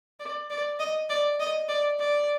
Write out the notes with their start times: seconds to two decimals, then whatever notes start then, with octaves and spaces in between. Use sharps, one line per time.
0.20 D5
0.51 D5
0.80 D#5
1.09 D5
1.40 D#5
1.69 D5
1.99 D5